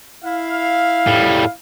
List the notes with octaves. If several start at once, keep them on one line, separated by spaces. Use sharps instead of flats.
E4 F5
A2 G3